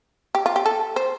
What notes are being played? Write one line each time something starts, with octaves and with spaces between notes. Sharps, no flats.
G4
F4
G4
A4
C5